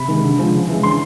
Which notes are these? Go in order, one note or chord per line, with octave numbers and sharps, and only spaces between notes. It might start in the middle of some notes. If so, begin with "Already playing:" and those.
Already playing: C3 B5
D#3 G#3
D3
F3 G#3
C#3
E3 G#3
D3 C6